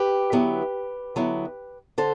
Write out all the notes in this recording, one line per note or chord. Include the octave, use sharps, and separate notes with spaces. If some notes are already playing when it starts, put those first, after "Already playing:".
Already playing: G4 B4
D3 F#3 B3 E4
D3 F#3 B3 E4
D3 A4 C5